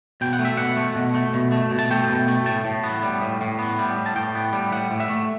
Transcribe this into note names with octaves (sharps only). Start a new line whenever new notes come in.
B2 G5
F#5
A3
E5
B2 F#5
A3
B2
A3
B2
A3
B2
A5
A3 G5
B2
A3
A2 A5
A2
B3
G3
A2
A2
B3
G3
A2
A5
A2 G5
B3
G3
A2 F#5
A2
E5
A3